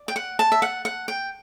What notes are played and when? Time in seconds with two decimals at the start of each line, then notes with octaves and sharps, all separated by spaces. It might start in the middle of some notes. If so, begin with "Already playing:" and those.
Already playing: D5
0.08 G5
0.16 F#5
0.39 A5
0.52 E5
0.62 F#5
0.85 F#5
1.08 G5